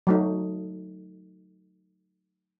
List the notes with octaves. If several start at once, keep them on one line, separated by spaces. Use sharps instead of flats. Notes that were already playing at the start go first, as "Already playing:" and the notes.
F#3 A3 D#4